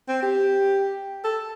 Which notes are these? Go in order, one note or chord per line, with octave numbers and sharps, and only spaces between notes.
C4
G4
A4